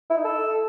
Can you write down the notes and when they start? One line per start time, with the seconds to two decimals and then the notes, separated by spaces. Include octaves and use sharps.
0.10 E4
0.17 D#4
0.24 A4